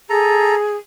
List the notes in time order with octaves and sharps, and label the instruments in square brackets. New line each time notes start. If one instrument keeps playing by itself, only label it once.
[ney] G#4 [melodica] A4 A#5